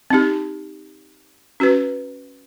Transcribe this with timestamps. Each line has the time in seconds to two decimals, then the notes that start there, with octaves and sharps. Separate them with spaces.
0.10 C4 D#4 G4
1.60 C#4 F#4 B4